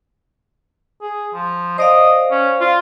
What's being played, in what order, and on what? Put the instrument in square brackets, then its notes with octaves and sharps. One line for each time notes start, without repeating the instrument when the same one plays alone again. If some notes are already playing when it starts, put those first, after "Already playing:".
[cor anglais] G#4
F3
[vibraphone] C5 D5 F5 [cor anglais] D#5
[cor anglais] C#4
F4